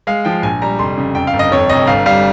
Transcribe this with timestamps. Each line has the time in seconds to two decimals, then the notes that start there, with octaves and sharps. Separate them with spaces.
0.07 G#3 F5
0.25 F3 G5
0.43 A#1 G#5
0.62 G3 A#5
0.79 F1 C6
0.98 C#3
1.15 F2 G5
1.27 F5
1.33 G1
1.39 D#5
1.52 F2 C#5
1.69 F1 D#5
1.87 G1 F5
2.06 G3 F5